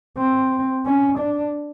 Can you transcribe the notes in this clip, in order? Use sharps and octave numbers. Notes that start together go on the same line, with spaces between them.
C4
C#4
D4